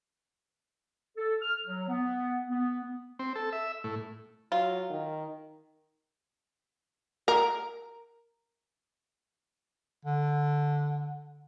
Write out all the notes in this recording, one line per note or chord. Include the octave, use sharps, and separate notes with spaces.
A4
F6
F#3
B3
B3
C4
A4
E5
A2
F#3 F4
D#3
A#4
D3